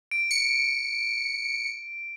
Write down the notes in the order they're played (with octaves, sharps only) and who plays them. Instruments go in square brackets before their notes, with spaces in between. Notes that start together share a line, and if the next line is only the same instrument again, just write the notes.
[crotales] D7
[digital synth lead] C#7